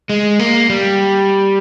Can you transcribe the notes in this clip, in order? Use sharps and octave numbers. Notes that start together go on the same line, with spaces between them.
G#3
A#3
G3